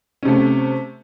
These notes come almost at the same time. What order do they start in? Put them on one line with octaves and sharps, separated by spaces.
C#4 C3 A3